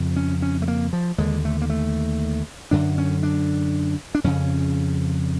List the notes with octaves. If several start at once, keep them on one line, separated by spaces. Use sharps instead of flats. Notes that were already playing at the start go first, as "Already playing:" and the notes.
Already playing: F2 C#3
C#4
C#4
A3
A#3
F3
D#2 D3 G#3
A3
A#3
A3
F#2 D3 D4
C#4
D4
D4
F2 C#3 C#4